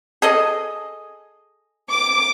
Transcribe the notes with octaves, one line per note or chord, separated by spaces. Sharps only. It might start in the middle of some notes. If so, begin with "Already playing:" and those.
G#4 A4 D#5
D6